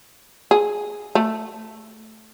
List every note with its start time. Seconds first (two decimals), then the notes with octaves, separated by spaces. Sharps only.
0.51 G#4
1.15 A3